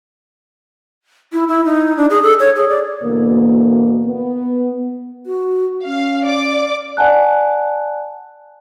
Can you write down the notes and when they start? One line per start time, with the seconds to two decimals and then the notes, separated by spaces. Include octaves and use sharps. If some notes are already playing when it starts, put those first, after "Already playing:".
1.33 E4
1.48 E4
1.65 D#4
1.97 D4
2.10 G#4
2.23 A4
2.40 C#5
2.56 G#4
2.69 D5
3.03 D2 B2 E3 A#3
4.06 B3
5.26 F#4
5.86 C#4 F5
6.26 D5 D6
6.97 D5 F#5 G#5 A5 F#6